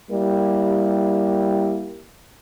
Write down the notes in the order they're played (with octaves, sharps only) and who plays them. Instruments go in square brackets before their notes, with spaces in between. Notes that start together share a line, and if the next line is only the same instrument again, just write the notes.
[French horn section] G3 A#3 E4 G4